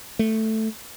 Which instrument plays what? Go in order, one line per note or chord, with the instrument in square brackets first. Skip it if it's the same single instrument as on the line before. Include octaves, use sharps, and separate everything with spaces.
[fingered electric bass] A3